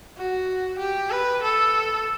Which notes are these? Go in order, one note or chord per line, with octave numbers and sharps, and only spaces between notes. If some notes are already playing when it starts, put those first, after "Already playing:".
F#4
G4
B4
A4